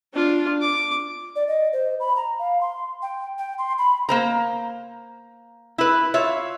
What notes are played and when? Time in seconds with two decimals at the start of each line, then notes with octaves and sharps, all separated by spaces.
0.13 D4 F4
0.61 D6
1.36 D5
1.48 D#5
1.73 C5
2.00 B5
2.16 A#5
2.39 F5
2.61 C6
3.02 G5
3.38 G5
3.58 C6
3.78 B5
4.09 A#3 C5 A#5
5.78 E4 B4
6.14 F4 C#5 E5